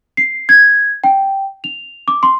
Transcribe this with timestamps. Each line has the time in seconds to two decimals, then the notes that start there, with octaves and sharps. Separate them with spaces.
0.17 C7
0.49 G#6
1.04 G5
1.64 F7
2.08 D6
2.23 C6